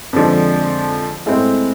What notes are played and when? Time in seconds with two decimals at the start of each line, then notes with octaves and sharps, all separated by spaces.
0.13 F2 D3 F3 G#3 D4
1.26 A2 G#3 C4